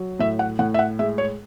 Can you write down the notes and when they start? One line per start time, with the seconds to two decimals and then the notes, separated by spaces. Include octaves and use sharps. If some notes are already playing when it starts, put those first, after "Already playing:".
Already playing: F#3
0.19 A2 E5
0.39 F#5
0.59 A2 F#5
0.74 E5
0.79 F#5
0.99 G#3 E5
1.18 C#5